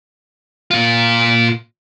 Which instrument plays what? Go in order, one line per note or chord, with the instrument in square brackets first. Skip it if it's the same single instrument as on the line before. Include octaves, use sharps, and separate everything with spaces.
[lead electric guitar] A#2 F4